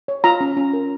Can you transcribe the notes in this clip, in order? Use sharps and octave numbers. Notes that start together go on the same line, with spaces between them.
C#5
F4 A#5
C#4
C#4
A#4